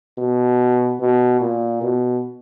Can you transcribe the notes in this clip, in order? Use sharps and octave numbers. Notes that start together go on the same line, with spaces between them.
B2
B2
A#2
B2